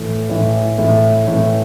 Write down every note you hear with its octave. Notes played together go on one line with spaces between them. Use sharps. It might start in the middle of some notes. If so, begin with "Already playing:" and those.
Already playing: A2 E3 A3
A2 E3 A3
A2 E3 A3
A2 E3 A3